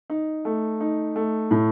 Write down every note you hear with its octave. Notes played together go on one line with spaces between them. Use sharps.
D#4
A3
D#4
A3
A2